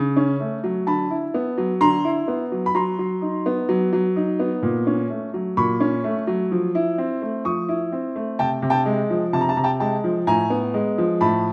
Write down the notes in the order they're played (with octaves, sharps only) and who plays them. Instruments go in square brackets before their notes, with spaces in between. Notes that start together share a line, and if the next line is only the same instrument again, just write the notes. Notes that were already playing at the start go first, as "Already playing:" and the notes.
Already playing: [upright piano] C#3
C#4
A3
F#3
D3 A5 B5
E4
B3
F#3
D3 A#5 C6
E4
B3
F#3
B5
F#3 A#5 C6
F#3
D#4
B3
F#3
F#3
D#4
B3
A#2
C#4
A3
F#3
A#2 B5 C#6
C#4
A3
F#3
F3
E4
C4
A3
F3 C#6 D#6
E4
C4
A3
C3 G5 A5
C3
G5 A5
G#3
F3
C3 A5
A#5
A5
C3 A#5
G5 A5
G#3 G5 A5
F3
A2 G#5 A#5
B3
G#3
F3
A2 A5 B5